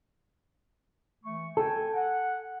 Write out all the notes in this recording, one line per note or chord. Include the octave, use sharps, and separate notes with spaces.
E3 A3 C#6
A4 G5 G#5
F#5